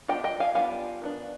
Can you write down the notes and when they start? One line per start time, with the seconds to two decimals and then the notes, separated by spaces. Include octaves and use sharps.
0.08 G3 B3 D4 F4 D#5 G5
0.24 D#5 G5
0.40 F5 G#5
0.55 G3 B3 D4 F4 F5 G#5
1.02 D#3 B3 D4